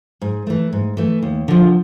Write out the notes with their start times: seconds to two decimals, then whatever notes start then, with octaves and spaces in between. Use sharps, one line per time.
0.21 G#2
0.47 E3 A3
0.72 G#2
0.97 E3 A3
1.22 D#2
1.48 D3 F3